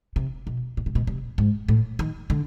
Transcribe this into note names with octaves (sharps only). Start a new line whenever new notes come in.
C3
B2
B2
C3
B2
C3
G#2
A2
D#3
D3